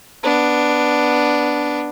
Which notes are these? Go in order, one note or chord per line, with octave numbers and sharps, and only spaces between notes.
B3 D4